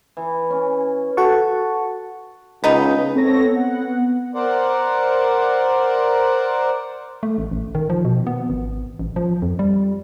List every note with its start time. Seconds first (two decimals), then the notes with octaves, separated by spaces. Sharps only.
0.17 E3
0.50 C#4
1.17 F#4 A4 F#5 A5 C#6
2.64 C#2 B3 D#4
3.13 B3 C4 A4 C#5 A#6
3.55 B3 F#5
4.35 A#4 C5 D5 F#5
7.23 A3
7.38 A1
7.51 A1
7.75 D#3
7.90 F3
8.05 B2
8.27 B3
8.50 G#1
8.99 A1
9.16 F3
9.42 F2
9.59 G3